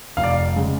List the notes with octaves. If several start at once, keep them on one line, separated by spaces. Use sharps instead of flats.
F1 F5
D5
F5
C#3 G#3